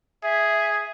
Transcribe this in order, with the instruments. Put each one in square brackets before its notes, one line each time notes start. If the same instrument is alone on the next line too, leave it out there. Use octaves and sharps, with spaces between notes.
[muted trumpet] G#4 [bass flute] E5